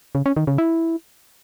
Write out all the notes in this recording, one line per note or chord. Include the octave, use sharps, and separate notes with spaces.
C#3
C#4
D#3
C#3
E4